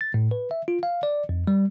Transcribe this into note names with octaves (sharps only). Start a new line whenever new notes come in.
A6
A2
B4
E5
F4
F5
D5
F2
G3